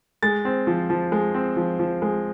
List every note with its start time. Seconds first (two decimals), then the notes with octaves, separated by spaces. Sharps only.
0.23 G#3 A6
0.45 C4
0.67 F3
0.90 F3
1.12 G#3
1.34 C4
1.56 F3
1.79 F3
2.02 G#3